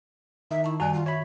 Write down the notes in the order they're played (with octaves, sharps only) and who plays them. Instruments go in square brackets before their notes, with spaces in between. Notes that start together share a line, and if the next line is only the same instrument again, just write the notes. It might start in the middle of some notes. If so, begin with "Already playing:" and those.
[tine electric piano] D#3 D#4 [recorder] E5
[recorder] E4 [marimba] A5 C#6
[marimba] F#2 D#3 D5 [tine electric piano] G3 F#4 [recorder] G#5
[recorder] F4
[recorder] F#4 [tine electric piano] C#5 B5 [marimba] E5